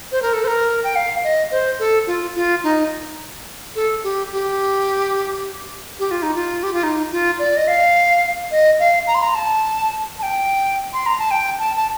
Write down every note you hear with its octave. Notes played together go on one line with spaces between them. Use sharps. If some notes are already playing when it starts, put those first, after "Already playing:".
C5
A#4
A4
C5
A#4
G5
F5
D#5
C5
A4
F4
F4
D#4
A4
G4
G4
G4
F4
D#4
F4
G4
F4
D#4
F4
D5
D#5
F5
D#5
F5
A#5
C6
A#5
A5
A5
G5
C6
A#5
A5
G5
A5
A5